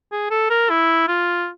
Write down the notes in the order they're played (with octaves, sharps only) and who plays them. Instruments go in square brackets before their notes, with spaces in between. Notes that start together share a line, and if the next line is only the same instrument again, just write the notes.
[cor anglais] G#4
A4
A#4
E4
F4